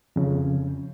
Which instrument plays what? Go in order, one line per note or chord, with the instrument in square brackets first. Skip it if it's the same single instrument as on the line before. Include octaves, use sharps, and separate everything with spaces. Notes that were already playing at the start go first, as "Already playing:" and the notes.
[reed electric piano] F2 C#3